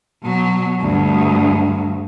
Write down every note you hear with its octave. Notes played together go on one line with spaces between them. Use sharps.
B2 F#3
D2 G2